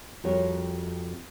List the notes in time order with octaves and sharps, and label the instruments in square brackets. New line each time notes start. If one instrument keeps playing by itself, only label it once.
[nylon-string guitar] F2 G3 F#4 A#4 C#5 A5